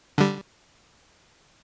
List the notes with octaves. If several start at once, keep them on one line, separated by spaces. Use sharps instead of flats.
D3 G3